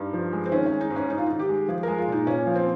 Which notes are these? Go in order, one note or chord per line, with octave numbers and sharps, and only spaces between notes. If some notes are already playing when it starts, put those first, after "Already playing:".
Already playing: G2 D#4
F3
G#3
C4
D#3 C#4
C#4
G#3
D#4
G#2
C#4
G#2 D#4
F4
D#3 D#4
G4
G#3
F3 G#4
G#3 A#4
F4
A#2 D#4
A#2 C#4
F3
C4